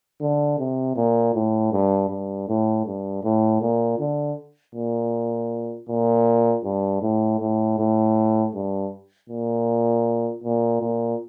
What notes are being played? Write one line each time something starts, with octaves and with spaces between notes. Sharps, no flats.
D3
C3
A#2
A2
G2
G2
A2
G2
A2
A#2
D3
A#2
A#2
G2
A2
A2
A2
G2
A#2
A#2
A#2